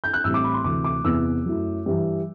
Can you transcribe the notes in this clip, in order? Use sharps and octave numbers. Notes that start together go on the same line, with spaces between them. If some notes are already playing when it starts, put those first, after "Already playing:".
G6
F#6
A1 A2 G3 C4 E4 E6
D6
B5
C6
D2 C3 E3 D6
D6
E2 C3 E3 B3 E6
F#2 F#3 A3 E4
G2 E3 G3